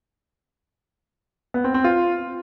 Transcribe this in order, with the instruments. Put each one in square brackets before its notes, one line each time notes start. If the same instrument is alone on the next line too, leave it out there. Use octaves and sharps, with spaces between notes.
[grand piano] B3
C4
C4
F4